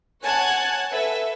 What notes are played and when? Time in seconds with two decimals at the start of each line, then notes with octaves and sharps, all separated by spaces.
0.22 C#5 F#5 G#5 A5 F#6 G#6
0.90 A4 B4 E5